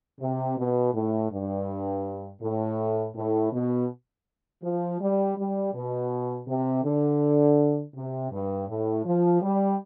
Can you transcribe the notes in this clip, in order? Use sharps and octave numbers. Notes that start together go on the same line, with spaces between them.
C3
B2
A2
G2
A2
A2
B2
F3
G3
G3
B2
C3
D3
C3
G2
A2
F3
G3